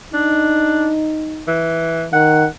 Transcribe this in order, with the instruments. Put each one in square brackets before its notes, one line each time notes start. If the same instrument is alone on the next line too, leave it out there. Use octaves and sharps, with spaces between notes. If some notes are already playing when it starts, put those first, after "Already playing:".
[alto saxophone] D4 [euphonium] D#4
[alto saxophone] E3
[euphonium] D#3 [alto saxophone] F#5